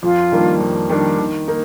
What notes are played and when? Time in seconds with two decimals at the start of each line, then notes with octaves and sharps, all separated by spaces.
0.03 F2 F4
0.32 D#3 G3 A#3 D4
0.60 F2
0.89 D#3 G3 A#3 D4
1.19 D#3
1.48 A#3 D#4